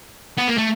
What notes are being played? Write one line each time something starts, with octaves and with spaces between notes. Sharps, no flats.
B3
A#3
A3